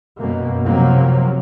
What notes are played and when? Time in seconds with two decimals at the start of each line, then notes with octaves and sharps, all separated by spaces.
0.18 F#2 B2 A#3
0.67 C3 F3 F#3 A#3 C4